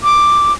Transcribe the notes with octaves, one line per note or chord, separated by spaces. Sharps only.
D6